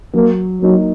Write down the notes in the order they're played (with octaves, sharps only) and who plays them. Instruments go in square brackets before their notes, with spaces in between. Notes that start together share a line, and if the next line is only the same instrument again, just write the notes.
[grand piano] F#3 [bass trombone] A#3
[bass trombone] F#3 [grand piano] A#3 D#4